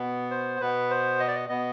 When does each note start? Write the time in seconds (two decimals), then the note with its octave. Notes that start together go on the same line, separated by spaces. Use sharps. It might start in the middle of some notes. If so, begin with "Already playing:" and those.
Already playing: B2 B3
0.31 C5
0.60 B2 B3 B4
0.90 C5
1.20 D#5
1.28 D5
1.35 D#5
1.49 B2 B3 D#5